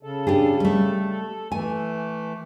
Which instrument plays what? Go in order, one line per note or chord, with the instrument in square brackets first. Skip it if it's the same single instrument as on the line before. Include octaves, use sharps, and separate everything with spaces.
[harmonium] C#3 A4
[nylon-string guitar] D4 G4 G#4
G3 A3
[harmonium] A4
[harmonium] E3 A3 [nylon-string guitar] G#5